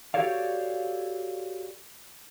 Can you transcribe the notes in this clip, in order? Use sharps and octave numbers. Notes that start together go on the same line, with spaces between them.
F#4 G4 A4 C#5 D5 F5